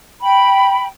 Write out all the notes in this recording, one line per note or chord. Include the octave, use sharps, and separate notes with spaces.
G5 B5